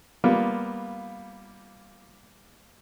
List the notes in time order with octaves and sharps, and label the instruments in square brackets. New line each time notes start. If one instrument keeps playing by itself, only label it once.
[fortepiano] G3 A#3 B3 F4